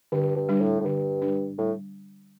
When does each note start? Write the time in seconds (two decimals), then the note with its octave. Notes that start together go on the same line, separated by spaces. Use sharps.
0.12 G2 D3
0.36 G2
0.49 G3 D4
0.61 A2
0.80 A2
0.85 G2 D3
1.22 G3 D4
1.58 A2 G3